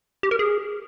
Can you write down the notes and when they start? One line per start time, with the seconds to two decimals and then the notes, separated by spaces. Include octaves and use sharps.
0.23 G4
0.31 A#4
0.39 G#4